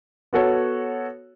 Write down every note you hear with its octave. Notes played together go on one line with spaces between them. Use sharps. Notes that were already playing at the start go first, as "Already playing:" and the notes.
B3 F#4 A4 C#5